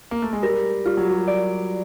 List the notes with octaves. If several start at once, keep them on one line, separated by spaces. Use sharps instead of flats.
A#3
A3
G#3
G3 A#4
G3 F4
F#3
G3
D5